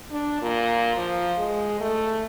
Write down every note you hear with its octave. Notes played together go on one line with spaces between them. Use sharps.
D4
A#2
F3
G#3
A3